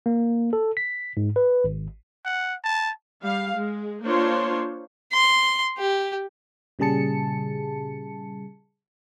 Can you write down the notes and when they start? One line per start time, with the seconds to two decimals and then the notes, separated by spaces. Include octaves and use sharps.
0.06 A#3
0.53 A4
0.77 B6
1.17 G#2
1.36 B4
1.64 G#1
2.25 F#5
2.64 A5
3.23 G3 F5
3.56 G#3
4.03 A#3 D4 F4 C5 C#5 C6
5.12 C6
5.78 G4
6.79 A#2 C#3 G3 G#4 A5 C#7